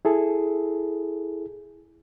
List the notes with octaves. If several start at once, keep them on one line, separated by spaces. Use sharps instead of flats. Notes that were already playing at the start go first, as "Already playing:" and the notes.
E4 G#4 A4